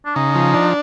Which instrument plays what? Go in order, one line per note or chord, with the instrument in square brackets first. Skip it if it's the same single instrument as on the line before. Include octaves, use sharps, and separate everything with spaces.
[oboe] D4
[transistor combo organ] C#3 [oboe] D#4
[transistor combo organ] F3
D4